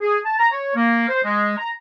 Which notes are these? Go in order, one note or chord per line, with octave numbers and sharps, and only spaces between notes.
G#4
A5
A#5
C#5
A#3
C5
G#3
A#5